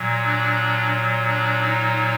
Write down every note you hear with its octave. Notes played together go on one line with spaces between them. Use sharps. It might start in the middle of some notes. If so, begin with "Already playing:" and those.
Already playing: A#2 F#3
D4
D4
D#4